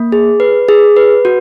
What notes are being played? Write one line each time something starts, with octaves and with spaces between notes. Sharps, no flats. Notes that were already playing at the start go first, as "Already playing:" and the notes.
Already playing: A#3
G#4
B4
G#4
B4
F#4